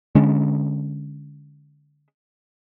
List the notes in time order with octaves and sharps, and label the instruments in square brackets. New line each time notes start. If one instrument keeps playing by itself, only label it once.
[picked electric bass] D3 G#3 C#4